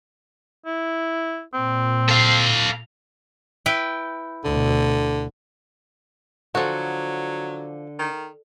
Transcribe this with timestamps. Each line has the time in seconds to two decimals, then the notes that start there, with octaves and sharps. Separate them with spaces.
0.66 E4
1.54 A#2 C4
2.09 A4 F5
3.66 E4 B4 G5
4.45 D2 B2 D3
6.55 D3 F3 F#3 F#4
7.99 D#3